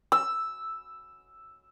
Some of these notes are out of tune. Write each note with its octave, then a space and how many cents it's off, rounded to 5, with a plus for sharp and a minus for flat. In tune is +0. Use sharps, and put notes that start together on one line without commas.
E6 +0